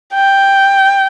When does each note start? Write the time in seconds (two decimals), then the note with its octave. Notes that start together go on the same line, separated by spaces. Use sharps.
0.14 G5